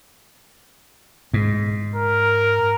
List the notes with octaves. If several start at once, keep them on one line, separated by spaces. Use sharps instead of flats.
G#2
A#4